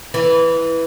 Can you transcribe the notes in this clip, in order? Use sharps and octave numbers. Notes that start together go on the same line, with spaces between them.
E3